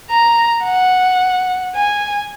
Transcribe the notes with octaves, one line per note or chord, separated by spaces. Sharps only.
A#5
F#5
G#5